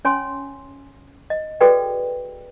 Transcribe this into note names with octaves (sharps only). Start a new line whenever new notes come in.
C#4 C#5 G#5 C6
D#5
F#4 G#4 A4 B4 D5 G5